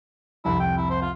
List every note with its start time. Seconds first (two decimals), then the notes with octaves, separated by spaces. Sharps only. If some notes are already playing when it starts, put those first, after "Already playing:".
0.45 C2 F2 E4
0.60 G5
0.77 E4
0.90 C5
1.02 F4